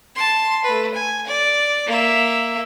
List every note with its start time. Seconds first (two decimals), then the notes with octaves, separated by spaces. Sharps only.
0.15 A5 C6
0.65 A3 B4
0.94 G#5
1.27 D5
1.87 A#3 E5